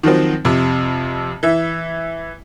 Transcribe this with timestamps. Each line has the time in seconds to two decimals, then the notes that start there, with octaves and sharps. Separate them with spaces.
0.03 D#3 F3 F#3 C4
0.45 F2 C3
1.43 E3 E5